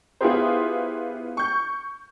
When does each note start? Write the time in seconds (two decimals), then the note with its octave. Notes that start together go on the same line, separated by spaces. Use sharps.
0.21 B3 E4 F4 G4 G#4 C5
1.37 C#6 G6